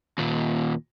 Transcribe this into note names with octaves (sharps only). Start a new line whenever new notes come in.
D#2 A#2